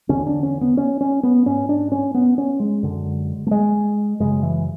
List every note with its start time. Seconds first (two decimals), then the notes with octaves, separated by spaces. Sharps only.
0.09 E2 D3 C#4
0.27 D4
0.43 C#4
0.61 B3
0.77 C#4
1.01 C#4
1.23 B3
1.46 G#2 C#4
1.69 D4
1.92 C#4
2.14 B3
2.38 C#4
2.60 G#3
2.83 F#2 D3
3.47 A3
3.51 G#3
4.20 F#2 C#3 G#3
4.43 E3